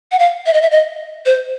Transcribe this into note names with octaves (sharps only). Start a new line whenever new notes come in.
F#5
F5
E5
D#5
E5
D#5
C5